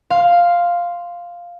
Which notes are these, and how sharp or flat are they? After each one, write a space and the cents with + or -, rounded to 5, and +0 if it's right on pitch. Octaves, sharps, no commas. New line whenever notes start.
F5 +0 C6 +0